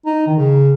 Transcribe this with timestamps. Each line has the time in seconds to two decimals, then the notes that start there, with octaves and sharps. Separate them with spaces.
0.06 D#4
0.27 D#3
0.38 C#3